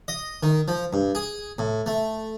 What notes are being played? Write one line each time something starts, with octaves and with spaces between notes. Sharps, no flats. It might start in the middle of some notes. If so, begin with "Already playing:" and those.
D#5
D#3
F3
G2
G#4
A2
A3